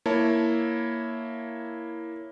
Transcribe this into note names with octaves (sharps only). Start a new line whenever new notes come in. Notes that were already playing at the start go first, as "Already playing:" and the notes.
A#3 E4 C#5 A5